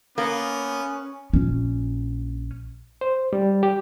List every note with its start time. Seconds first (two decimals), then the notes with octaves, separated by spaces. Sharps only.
0.18 A#3 B3 C#4
1.34 A#1 C#4
3.01 C5
3.33 G3
3.63 G4